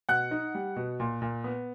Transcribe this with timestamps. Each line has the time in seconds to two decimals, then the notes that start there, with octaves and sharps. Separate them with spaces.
0.09 B2 F#5 F#6
0.31 D#4
0.55 G3
0.76 B2
1.00 A#2
1.22 A#2
1.44 B3